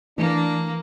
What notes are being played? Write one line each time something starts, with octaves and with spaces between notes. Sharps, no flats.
E3 A3 A#3 D4